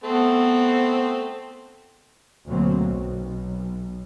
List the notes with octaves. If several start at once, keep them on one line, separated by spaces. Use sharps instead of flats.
A3 B3 C4
D2 B2 F#3 A#3 C4
B1